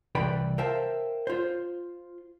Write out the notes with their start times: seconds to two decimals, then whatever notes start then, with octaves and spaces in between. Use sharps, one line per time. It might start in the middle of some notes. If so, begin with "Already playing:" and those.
0.15 C2 E3 B4 D5 G5 B5
0.58 A#4 C5 E5 F5 G5 A5
1.27 F4 C5